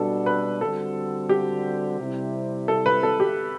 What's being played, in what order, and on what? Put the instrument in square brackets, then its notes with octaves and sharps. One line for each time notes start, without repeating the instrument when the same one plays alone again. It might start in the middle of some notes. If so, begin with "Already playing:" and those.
Already playing: [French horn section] B2 G3 D4 F#4 [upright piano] A4
[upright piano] B4
[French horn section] D3 G3 C4 F#4 [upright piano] A4
[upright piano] G4
[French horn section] C3 G3 C4 E4
[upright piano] A4
B4
A4
G4